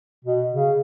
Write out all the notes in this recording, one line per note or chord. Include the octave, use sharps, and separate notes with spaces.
B2
C#3